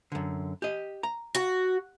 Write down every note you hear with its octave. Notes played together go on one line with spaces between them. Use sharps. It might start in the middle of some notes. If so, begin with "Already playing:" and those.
F#2 D3
G4 D#5
A#5
F#4